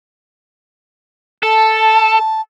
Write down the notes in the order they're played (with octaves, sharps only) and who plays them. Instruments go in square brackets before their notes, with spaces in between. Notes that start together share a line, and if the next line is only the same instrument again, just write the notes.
[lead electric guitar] A4 [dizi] A5